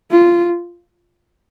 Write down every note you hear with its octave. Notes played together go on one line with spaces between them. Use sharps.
F4